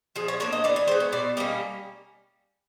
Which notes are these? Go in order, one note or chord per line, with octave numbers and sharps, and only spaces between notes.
F3 G#4
C#5
A#3 D4 C#5
D#5
E3 D5
C#5
G#3 B3 C5
C#5
B2 D5
G3 A#3 C#4 D#5